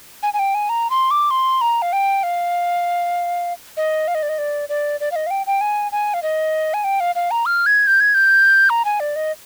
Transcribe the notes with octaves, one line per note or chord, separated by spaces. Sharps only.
G#5
G#5
G5
G#5
A#5
C6
D6
C6
A#5
F5
G5
F5
D#5
F5
D#5
D5
D#5
D5
D5
D5
F5
D#5
F5
G5
G5
G#5
G#5
F5
D#5
G#5
G5
F5
F5
A#5
F6
G#6
G6
G#6
G6
A#5
G#5
D5
D#5